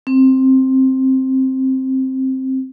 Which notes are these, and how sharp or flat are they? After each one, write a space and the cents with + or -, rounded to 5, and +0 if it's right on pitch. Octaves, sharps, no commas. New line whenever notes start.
C4 +10